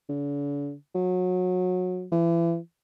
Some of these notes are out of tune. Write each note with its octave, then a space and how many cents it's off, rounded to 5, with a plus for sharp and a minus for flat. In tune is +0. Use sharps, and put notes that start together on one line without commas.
D3 -45
F#3 -25
E3 +35